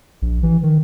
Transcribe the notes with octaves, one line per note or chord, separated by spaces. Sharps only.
A#1
E3
D#3